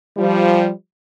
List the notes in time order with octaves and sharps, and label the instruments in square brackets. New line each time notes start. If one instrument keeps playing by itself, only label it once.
[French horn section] F3 G3